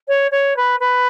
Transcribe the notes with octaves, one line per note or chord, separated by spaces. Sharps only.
C#5
C#5
B4
B4